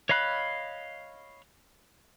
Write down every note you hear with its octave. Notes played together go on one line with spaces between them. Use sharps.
C#5 D#5 F5 B5 F#6